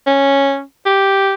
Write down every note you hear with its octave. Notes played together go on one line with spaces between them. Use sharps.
C#4
G4